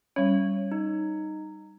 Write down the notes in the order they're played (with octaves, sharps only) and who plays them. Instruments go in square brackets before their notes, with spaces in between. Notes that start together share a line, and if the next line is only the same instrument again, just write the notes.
[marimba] G3 C#4 [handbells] C#5
[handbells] D#4